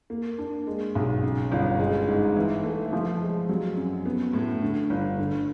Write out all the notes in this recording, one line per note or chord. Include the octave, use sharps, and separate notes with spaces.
A#3
D4
G#3
B1
C#3
G1
G#3
G#2
E3
A3
F3
G#3
F#3
F#2
B3
A2
D3
G1
D3